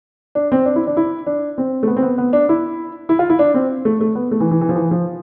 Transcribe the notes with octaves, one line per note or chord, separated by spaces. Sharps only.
D4
C4
D4
E4
D4
E4
D4
C4
A3
B3
C4
B3
B3
D4
E4
E4
F4
E4
D4
C4
A3
A3
B3
A3
E3
E3
E3
F3
E3
F3